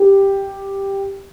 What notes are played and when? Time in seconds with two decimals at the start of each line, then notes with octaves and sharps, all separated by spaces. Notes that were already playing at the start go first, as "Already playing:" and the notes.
Already playing: G4